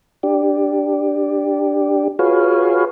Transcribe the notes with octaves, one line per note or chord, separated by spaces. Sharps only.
D4 G4
F4 F#4 G#4 B4 C#5 F5